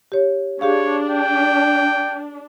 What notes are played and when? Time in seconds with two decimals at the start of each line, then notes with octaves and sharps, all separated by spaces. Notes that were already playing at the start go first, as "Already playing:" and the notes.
0.12 G4 C#5
0.61 D4 G4 G#4 C#5 F5
1.10 G5